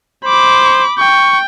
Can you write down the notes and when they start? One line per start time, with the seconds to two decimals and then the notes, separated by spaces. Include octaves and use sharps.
0.25 C5 B5 D6
0.98 G5 C#6